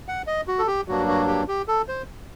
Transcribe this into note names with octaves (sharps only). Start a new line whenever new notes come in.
F#5
D#5
F#4
A4
G4
G2 F#3 A#3 D4 F#4
F#4
G4
G4
A4
C5